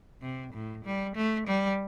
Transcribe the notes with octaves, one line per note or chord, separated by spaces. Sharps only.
C3
A2
G3
A3
G3